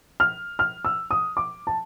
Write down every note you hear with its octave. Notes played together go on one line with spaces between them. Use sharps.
F6
F6
E6
D#6
D6
A5